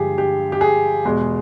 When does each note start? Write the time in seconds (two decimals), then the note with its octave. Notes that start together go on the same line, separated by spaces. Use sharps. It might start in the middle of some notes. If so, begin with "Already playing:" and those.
Already playing: G2 D3 F3 G#3 G4 G#4
0.18 G4
0.52 G4
0.61 G#4
1.05 E2 B2 G#3